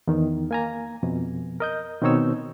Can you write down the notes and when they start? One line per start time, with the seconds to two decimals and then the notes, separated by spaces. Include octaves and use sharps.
0.08 E2 D#3
0.51 A#3 G#5 A#5
1.03 F2 B2
1.60 A#4 D#5 G6
2.02 B2 D#3 C4 D#4 C#5 E6